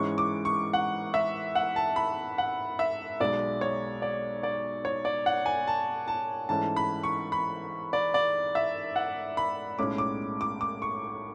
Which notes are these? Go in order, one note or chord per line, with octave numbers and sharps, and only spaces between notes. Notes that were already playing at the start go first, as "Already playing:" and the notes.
Already playing: G#2 E3 G#3 C#4 C#6
D6
C#6
F#5
E5
F#5
A5
B5
F#5
E5
B1 B2 G#3 D5
C#5
D5
D5
C#5
D5
F#5
G#5
A5
A5
G#2 E3 A3 C#4 A5
B5
C#6
B5
D5
D5
E5
F#5
B5
B1 A2 G#3 C#4 D6
D6
D6
D6
C#6